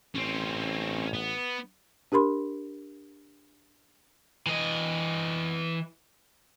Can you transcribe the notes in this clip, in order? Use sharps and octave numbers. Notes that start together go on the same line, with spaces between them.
A1 C4 C#4
B3
D4 G4 A#4 B5 C6
E3 D#5